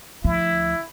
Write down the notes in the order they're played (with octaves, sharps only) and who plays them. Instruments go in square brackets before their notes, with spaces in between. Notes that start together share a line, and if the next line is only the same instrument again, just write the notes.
[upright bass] D2 F3 [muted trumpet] E4